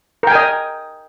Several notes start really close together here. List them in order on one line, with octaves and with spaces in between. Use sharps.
A#4 G5 G#5 D#5